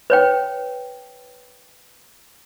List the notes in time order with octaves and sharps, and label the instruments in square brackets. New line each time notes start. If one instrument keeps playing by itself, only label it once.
[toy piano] B4 C#5 G5